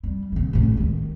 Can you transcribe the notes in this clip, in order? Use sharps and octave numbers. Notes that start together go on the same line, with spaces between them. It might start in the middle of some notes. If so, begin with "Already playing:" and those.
G3
A#2 D#3
A1 A2
D#3 G#3